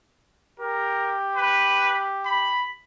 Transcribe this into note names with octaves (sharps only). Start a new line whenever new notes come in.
G4 A#4
B4
B5